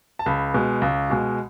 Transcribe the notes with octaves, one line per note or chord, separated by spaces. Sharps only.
A5
C#2 B5
B2 G#3
C#2
B2 G#3